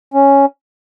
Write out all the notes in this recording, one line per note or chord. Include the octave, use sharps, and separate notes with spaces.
C#4